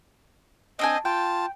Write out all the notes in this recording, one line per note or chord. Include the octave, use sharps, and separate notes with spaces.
C4 D4 D#5 G#5
F4 G5 A5